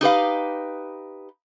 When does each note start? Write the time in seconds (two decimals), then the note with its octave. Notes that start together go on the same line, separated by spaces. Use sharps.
0.01 D#4 G4 B4 F5